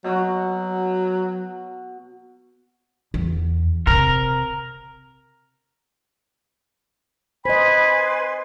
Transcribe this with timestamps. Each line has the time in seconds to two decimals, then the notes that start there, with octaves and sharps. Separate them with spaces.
0.04 B2 F#3 F#4
3.14 E2
3.87 C3 A#4
7.45 B4 C5 D#5 G#5 B5 C6